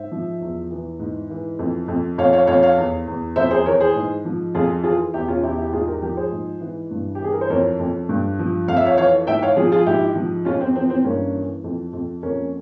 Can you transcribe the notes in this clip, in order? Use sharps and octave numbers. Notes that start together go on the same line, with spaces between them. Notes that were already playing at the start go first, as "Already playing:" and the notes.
Already playing: G#2 C5 E5
F3
E2
E3
G#2
E3
F2
F2
F2 C#5 F5
C#5 F5
F2 C#5 F5
C#5 F5
E2
E2
F2 C5 E5
G#4 C5
E3 A#4 C#5
G#4 C5
G#2
F3
F2 F4 G#4
E3 F4 G#4
E2 E4 G4
C#4 F4
E2 E4 G4
E4 G4
G#2 F4 G#4
G4 A#4
F3 G4 A#4
G#4 C5
G#2
E3
G2
G4
E3 G#4
A#4
C5
F2 A#4 C#5
F2
G2
F3
F2 F5
E5
C#5 F5
E3 C#5 F5
G#2 E5 G5
C#5 F5
F3 F4 G#4
F4 G#4
G#2 E4 G4
F3
F2 C#4 F4
C4
E3 C4
C4
G2 A#3 C#4
E3
F2
F2
F2 A#3 C#4